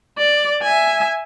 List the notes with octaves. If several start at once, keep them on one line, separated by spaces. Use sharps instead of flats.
D5
E5 G#5